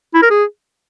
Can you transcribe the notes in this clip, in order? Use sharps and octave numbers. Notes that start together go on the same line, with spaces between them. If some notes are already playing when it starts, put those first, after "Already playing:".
E4
A#4
G#4